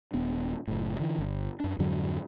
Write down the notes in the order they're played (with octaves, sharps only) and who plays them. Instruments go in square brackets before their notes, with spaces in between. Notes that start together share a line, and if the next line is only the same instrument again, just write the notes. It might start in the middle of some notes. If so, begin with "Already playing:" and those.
[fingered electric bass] D#1 B3 D4
F#1 F#2 A2
D3 E3
G1
F#2 D4
F2 G#2 D3 F#3